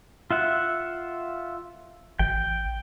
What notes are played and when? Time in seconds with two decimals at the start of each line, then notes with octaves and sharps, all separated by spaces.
0.31 F4 E5 F#5
2.19 A1 G5